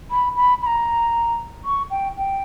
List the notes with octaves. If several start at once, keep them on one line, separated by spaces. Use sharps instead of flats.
B5
B5
B5
A#5
C#6
G5
G5